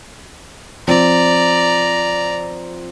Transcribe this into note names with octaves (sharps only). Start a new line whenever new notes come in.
F3 C4 D5 A#5